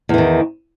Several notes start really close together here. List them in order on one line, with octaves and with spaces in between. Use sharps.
E2 E3 D#3